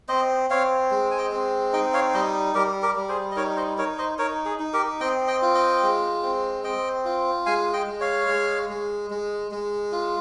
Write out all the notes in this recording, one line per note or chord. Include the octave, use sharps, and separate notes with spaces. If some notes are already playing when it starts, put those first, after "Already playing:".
C4 C5 D#5
C4 C#5 F5
G#3
G#5
D#5 G5
C4
D#4 D#5 G5
C#5 F5
G3 C5 D#5
G3 G4 A#4
G4 A#4
G3
G#4 C5
D#5
D#4 A#4 C#5
C5 D#5
D#4 A#4 C#5
C5 D#5
D#4 A#4 C#5
G#4
D#4
G4 A#4
C4 D#5 G5
D#5 G5
F4
D#5 G5
G#3
C4
C4 D#5 G5
F4
G#3 F5 G#5
D#5 G5
G#3
C#5 F5
G#3
G#3
G#3
G#3
F4